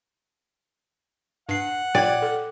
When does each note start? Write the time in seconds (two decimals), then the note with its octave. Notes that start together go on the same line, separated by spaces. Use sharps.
1.49 G2 F#5 C7
1.95 A#2 D5 G5 G#6
2.22 A4